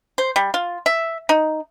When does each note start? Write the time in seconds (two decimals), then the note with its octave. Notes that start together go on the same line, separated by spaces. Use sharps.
0.18 C5
0.36 G3
0.54 F4
0.86 E5
1.29 D#4